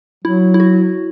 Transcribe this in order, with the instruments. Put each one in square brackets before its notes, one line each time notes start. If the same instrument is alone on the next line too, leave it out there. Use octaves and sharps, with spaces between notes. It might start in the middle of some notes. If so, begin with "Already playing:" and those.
[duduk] F#3 [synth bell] E4
[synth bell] E4
F#4